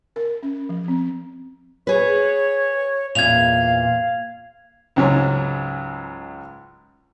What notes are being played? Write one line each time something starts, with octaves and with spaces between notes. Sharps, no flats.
A#4
C#4
F3
C4
G#4 B4 C#5
E2 A#2 F5 G#6 F7
C#2 G#2 F#3